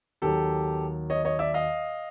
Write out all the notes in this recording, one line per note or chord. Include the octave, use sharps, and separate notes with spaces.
D#2 D#3 F#3 G4 A4
C#5 D#5
C#5 D#5
D5 E5
D#5 F5